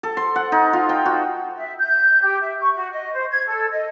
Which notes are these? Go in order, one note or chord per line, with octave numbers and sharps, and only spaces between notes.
A4
C6
F#5
D#4
F4
G5
F#4
E5
G6
G4
E5
C#6
F#4
D#5
C5
G#6
A4
D#5